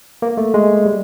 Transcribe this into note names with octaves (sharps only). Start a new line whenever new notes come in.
A#3
A3
G#3
G3